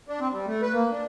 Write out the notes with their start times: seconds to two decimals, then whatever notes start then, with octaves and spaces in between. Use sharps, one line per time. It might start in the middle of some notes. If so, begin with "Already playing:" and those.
0.08 D4
0.20 C4
0.33 G3
0.47 A3
0.62 B4
0.73 A#3
0.91 D4